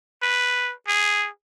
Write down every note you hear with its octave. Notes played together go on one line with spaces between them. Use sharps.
B4
G#4